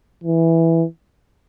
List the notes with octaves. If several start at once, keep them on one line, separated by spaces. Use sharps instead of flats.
E3